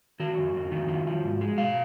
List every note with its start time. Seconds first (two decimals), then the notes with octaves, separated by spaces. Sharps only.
0.20 D#3 F#4
0.38 F2
0.54 F2
0.71 D#3
0.89 F3
1.07 F3
1.24 G#2
1.41 G#3
1.58 B2 F5